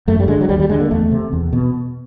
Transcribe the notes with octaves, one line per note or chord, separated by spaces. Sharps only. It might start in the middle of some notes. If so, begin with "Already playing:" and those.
F#2 A3
G3
D3 G#3
F#3
D#2 G3
G3
D3 G#3
A#3
E2 A3
C3
E2
B2